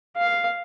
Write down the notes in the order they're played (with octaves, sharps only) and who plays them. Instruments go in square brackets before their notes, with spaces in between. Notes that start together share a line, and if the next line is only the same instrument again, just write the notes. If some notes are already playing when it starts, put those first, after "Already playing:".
[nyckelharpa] F5